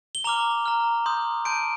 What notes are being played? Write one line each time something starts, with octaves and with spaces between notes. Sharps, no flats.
G7
A#5 D6 F6 F7
A#5 F6
C6 D#6 G6
A5 C6 G6 D7